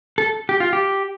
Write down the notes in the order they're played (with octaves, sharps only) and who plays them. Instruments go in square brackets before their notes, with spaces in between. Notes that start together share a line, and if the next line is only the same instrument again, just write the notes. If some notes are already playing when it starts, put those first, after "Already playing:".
[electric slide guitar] A4
G4
F4
G4